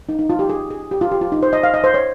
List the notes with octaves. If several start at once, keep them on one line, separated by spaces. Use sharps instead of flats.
D#4
D#4
F4
G4
G#4
G#4
G4
F4
G4
F4
D#4
C5
D#5
F5
D#5
C5
C#5